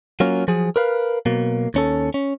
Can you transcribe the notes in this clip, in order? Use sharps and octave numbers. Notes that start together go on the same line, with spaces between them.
F#3 A#3 C#4 F4
F3 F#3 G#4
A#4 B4 F5
B2 F#3 A#3
D#2 C#4 A4
C#4